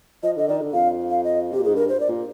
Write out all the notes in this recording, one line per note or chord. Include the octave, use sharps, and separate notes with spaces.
F3 D#5
D3 D#5
D#3 D5
D3
F2 F5
F5
D#5
C3 G4
A#2
G#2 G#4
G2 A#4
C5
D5
A#2